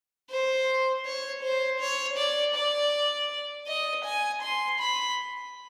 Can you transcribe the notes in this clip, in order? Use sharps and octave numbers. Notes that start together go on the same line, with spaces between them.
C5
C#5
C5
C#5
D5
D5
D#5
G#5
C6
B5